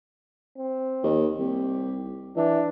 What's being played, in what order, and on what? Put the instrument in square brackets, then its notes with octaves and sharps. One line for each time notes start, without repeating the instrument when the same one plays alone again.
[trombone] C4
[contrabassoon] D#2
[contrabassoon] C2 [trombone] G4
[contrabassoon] E3 [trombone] D4